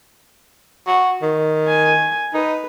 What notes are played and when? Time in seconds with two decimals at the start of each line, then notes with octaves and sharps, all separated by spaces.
0.87 F#4
1.22 D#3
1.68 G#5
2.34 D#4 B4